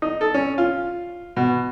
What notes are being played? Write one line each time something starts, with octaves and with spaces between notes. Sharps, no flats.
D#4
A4
C#4
F4
B2